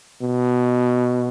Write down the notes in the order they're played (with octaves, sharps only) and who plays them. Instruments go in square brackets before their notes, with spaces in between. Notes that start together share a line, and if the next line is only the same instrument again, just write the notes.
[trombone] B2